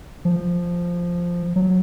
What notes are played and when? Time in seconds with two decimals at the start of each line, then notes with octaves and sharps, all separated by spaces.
0.25 F3
1.56 F#3